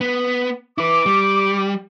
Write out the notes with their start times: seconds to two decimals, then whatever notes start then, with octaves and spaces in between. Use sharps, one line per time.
0.01 B3
0.78 E4 B4 D6
1.06 G3